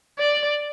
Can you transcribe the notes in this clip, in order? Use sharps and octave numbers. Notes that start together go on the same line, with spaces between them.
D5